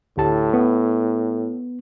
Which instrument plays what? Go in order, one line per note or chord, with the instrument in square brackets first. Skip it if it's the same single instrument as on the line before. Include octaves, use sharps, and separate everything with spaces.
[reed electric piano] D2 G4 A5 [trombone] A2
[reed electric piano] B3